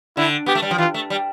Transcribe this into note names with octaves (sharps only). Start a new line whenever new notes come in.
D3 E4
B3 G4
A3
G3
F3
E3 F4
A3
G3